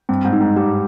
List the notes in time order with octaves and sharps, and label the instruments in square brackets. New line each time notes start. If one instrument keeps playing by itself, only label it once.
[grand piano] G2 [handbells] C4
[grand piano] G#2
[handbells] D#4
[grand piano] G#2
[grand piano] G#2 [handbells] G4